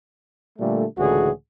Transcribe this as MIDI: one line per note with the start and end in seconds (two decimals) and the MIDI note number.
0.59 0.85 46
0.59 0.85 50
0.59 0.85 55
0.59 0.85 57
0.98 1.30 37
0.98 1.30 45
0.98 1.30 50
0.98 1.30 52
0.98 1.30 66
0.98 1.30 68